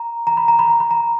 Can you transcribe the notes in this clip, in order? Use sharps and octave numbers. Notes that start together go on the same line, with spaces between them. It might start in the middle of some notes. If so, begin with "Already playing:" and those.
Already playing: A#5
A#5
B5
A#5
B5
A#5
B5
A#5